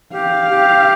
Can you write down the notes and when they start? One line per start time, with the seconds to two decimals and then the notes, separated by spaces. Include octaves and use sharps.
0.13 G4 F5
0.50 G4